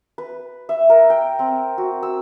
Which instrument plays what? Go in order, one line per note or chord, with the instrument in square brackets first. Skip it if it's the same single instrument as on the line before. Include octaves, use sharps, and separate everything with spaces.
[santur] B4
E5
A#4
G5
C4
F#4
E6